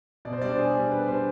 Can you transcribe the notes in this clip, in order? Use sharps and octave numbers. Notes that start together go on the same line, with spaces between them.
B2 D5
C5
G3 D4 D5
C5
B2 G#4
G3 D4 G#4
B2 B4
B4
G3 D4 C5